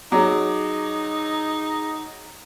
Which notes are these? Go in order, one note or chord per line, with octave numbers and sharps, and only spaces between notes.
F#3 D#4 G#4 D6